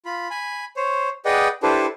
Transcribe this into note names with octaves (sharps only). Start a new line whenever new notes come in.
F4 B5
G#5 B5
C5 C#5
G#4 B4 D5 D#5 F#5 G5
D4 E4 G4 A4 B4 C5